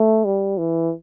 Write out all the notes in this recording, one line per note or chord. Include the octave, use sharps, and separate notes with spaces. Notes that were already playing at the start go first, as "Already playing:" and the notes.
Already playing: A3
G3
E3